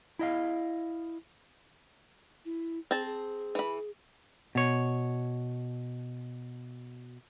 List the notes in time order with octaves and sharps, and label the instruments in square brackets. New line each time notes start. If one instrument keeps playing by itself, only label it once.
[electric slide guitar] E4 D#5 F5
[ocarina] E4
[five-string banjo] C4 A5 [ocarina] G#4
[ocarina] G#4
[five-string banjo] E3 B5
[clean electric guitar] B2 C#5